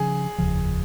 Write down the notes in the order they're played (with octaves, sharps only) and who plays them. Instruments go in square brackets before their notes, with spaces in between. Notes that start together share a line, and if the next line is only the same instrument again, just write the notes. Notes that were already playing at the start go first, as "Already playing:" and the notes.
Already playing: [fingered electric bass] C#3 F3 [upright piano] G#4
[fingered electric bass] F1 D#2 C#3 F3